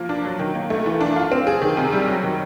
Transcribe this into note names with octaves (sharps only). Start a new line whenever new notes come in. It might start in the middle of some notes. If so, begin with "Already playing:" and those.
Already playing: F3 A#3
D4
F#3
D#3
A#3
A3
E3
D4
F4
C4
G#4
D#3
C3
G3
F#3
D#3